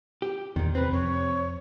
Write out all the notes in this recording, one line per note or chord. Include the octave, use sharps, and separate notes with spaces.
G4
E2 A#2 D#3
C3 C4 B4
F2 C#5